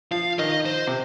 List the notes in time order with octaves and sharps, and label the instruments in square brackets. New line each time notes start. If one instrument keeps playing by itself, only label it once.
[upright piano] F3 [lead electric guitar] F5
[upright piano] D#3 [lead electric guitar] D#5
[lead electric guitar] C5
[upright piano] C3